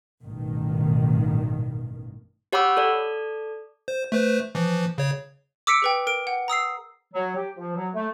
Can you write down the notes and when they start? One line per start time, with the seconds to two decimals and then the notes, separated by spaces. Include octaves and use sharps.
0.25 A1 G2 B2 D#3
2.52 G4 C#5 F#5 B5 D6 E6
2.77 A4 D5
3.88 C5
4.12 A3 B4 C5
4.55 E3 F3
4.98 C#3 C#5
5.67 D6 E6 B6 C#7 D7
5.82 G#4 B4 G5
6.07 A#4 D7
6.27 F#5
6.48 A#5 D#6 E6 C7
7.14 F#3
7.36 G4
7.57 F3
7.76 F#3
7.93 A3